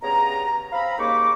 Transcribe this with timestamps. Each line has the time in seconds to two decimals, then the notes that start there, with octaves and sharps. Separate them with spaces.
0.02 G2 C#3 B3 A#5
0.72 C4 F5 A#5 B5
0.98 D#2 C#3 A#3 D#4 C#6 D6